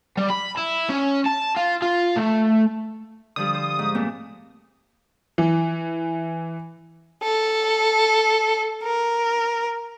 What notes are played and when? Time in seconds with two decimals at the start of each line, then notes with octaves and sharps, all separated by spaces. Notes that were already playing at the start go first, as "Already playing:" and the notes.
0.17 G3
0.30 B5
0.57 E4
0.90 C#4
1.26 A5
1.57 F4
1.82 F4
2.16 A3
3.36 D3 F3 G3 D#6
3.54 C5
3.79 G#2
3.95 A#2 A3 C4
5.38 E3
7.23 A4
8.83 A#4